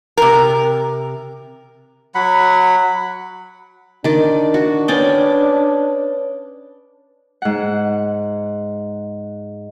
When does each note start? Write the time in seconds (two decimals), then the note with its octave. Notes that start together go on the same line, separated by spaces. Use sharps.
0.17 C3 A#4
2.15 F#3 F#5 B5
4.04 D#3 D4 D5
4.54 F#4
4.88 C#4 B4 C#5 D5 G5 D#6
7.42 G#2 F#5